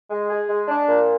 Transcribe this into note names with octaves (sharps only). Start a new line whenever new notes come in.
G#3
G#4
G#3
D4
A#2